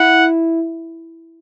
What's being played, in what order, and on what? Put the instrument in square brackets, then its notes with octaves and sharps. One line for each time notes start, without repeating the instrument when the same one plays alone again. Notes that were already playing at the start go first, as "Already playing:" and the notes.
Already playing: [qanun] E4 [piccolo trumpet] F#5